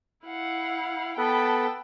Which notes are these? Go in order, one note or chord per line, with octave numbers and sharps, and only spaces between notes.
E4 F5 F#5
B3 A4 B4 G5 A5 B5